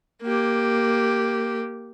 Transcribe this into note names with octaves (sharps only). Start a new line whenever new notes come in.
A#3 G4